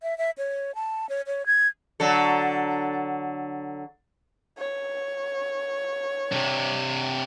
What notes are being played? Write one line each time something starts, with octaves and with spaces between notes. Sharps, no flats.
E5
E5
C#5
A5
C#5
C#5
G#6
D3 F#3 A4
C#5
C3 D4